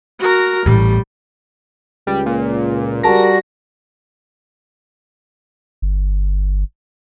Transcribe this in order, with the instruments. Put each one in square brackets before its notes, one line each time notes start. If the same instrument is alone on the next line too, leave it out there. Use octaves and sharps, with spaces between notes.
[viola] F#4 A#4
[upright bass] A1 A2 [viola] G3
[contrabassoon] C#2 [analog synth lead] G3
[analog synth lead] A#2
[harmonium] G3 F#4 [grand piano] G#4 A#4 A5 [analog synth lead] A#6
[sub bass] G1